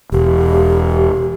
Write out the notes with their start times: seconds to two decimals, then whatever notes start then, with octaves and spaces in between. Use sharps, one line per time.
0.12 E1 G4